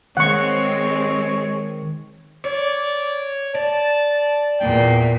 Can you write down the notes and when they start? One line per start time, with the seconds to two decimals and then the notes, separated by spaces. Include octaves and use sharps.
0.17 D#3 G#3 C4 C#5 F#5 C#6
2.45 C#5 D5
3.55 D5 A5
4.60 E2 A#2 G5